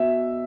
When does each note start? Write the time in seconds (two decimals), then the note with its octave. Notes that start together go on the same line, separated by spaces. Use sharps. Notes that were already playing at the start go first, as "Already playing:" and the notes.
Already playing: B2 E5